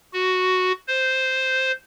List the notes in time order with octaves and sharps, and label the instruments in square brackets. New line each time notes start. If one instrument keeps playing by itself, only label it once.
[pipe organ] F#4
C5